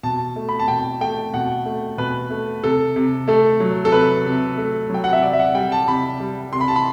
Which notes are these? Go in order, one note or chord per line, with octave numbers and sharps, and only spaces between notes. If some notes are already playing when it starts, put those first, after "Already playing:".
B2 A5
A3
B5
A5
B2 G5
A3 G5
B2 F#5
A3
B2 B4
A3
C3 A4
C3
A3 A4
F#3
A4
C3 B4
C3
A3
F#3 G5
F#5
E5
C3 D5
E5
F#5
G3 G5
A5
C3 B5
G3
C3 C6
B5
A5
B5